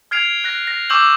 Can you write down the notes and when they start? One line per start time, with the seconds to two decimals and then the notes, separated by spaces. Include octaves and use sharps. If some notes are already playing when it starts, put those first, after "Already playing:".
0.11 F6 G#6 C7 D7 F7
0.44 F#6 A#6
0.67 A#6
0.90 C#6 D6 E6 G6 F#7